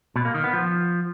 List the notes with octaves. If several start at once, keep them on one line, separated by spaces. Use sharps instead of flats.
B2
A#3
D#3
B3
F3